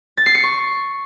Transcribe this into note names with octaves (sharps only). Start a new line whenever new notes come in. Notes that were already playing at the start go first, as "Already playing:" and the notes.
A6
C7
C#7
C#6